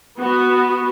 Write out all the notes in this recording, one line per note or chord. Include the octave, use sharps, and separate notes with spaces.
B3 F#4